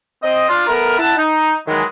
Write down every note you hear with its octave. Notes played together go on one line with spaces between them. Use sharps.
C4 D#5
D4 F4
A3 B3 A#4
E4 F#5 A5
D#4
D#3 E3 F#3 G#3